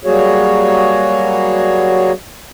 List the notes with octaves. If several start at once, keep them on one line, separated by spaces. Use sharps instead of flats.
F#3 G3 A#3 F#4 G#4 C#5